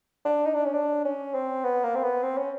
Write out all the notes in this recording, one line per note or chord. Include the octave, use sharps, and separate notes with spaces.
D4
D#4
D4
C#4
D4
C#4
C4
B3
A#3
C4
B3
C4
C#4